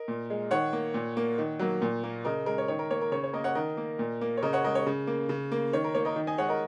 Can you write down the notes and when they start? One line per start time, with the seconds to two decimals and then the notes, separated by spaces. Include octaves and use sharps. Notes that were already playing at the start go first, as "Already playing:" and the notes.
Already playing: A#4 D#5
0.08 A#2
0.30 G#3
0.51 D#3 C#5 F#5
0.73 A#3
0.94 A#2
1.17 A#3
1.38 D#3
1.59 F#3 A#3
1.82 A#2
2.04 A#3
2.25 C#3 A#4 D#5
2.46 G#3 A#4
2.58 C#5
2.68 D#3 C#5
2.79 A#4
2.90 A#3 C#5
3.01 A#4
3.12 C#3 C#5
3.24 C#5
3.33 A#3 A#4 D#5
3.44 C#5 F#5
3.55 D#3 A#4 D#5
3.77 A#3
3.99 A#2
4.21 A#3
4.37 C#5
4.42 C#3 A#4 D#5
4.53 C#5 F#5
4.64 G#3 A#4 D#5
4.75 C#5
4.87 C#3
5.07 A#3
5.29 C#3
5.52 A#3
5.73 D#3 C#5
5.84 A#4
5.95 A#3 C#5
6.05 A#4 D#5
6.16 D#3
6.27 D#5 G#5
6.38 G#3 C#5 F#5
6.49 A#4 D#5